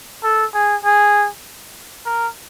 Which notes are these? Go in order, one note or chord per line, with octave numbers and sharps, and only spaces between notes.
A4
G#4
G#4
A#4